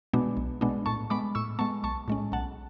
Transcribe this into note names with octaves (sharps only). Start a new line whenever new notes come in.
B2 G#3 B3 D4
B1
B2 G#3 B3 D4
A2 A5 C#6
G#3 B3 B5 D6
A2 C#6 E6
G#3 B3 A5 C#6
B1 A5 C#6
A2 G#3 C#4
B1 F#5 A5